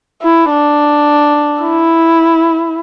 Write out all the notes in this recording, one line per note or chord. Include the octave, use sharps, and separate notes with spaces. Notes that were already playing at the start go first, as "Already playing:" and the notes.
E4
D4
E4